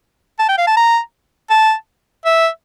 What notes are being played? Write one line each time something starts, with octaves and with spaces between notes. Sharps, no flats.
A5
G5
F5
A5
A#5
A5
E5